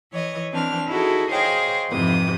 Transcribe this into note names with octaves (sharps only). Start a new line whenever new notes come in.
E3 C#5 D#5
E3 C4 D4 F6
D#4 E4 F#4 G#4 A4
G#4 C5 C#5 D#5 F5 G5
F2 G#2 C3 E3 D#6